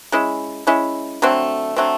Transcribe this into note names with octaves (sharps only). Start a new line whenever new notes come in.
G#3 C#4 E4
G#3 C#4 E4
D3 F#3 A3 C4
D3 F#3 A3 C4